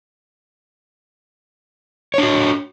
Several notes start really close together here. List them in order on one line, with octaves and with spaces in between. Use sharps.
C#5 D4 F#4